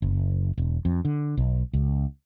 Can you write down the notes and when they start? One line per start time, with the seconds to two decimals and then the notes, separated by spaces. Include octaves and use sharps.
0.02 F#1
0.58 E1
0.85 F2
1.05 D3
1.37 B1
1.73 C#2